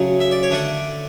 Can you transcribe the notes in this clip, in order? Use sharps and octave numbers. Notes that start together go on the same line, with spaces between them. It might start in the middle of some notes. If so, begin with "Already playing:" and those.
Already playing: C#3 F#3 A3 C#4
E5
D5
C#5
D3 A3 D4 D5